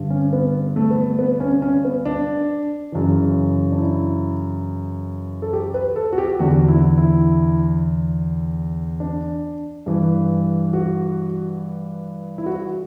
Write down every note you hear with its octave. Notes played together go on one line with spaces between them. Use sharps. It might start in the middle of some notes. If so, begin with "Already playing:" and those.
Already playing: G2 D3
C#4
B3
A3
B3
B3
C#4
C#4
B3
D4
F#2 C#3 E3
D4
E4
A4
G4
B4
A4
F#4
G4
E2 D3 F#4
E4
E4
D4
G2 E3
F#4
E4
F#4